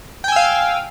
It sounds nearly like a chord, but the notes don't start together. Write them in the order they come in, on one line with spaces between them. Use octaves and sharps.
G5 G#5 E6 F5